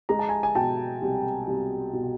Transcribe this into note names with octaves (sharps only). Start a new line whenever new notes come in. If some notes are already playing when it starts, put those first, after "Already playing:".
G#3 A#5
A5
G#5 A#5
G#5
B2 G5 A5
C2
C2
B2